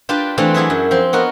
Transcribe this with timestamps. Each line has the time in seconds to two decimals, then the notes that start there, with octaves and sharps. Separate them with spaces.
0.09 D4 F4 G4 B4 D5 A5
0.38 E3 A3 C4 D4 F4
0.54 F#3 D4 E4 G#4 B4
0.70 F#2
0.91 F3 C4 C6
1.13 B3 F#4 A#4 D#5 F#5